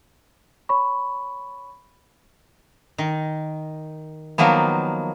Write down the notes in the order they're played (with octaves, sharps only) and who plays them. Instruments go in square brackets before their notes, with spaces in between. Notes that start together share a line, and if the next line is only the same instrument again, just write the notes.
[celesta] C#5 B5 C#6
[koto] D#3
D#3 F3 F#3 A#3 B3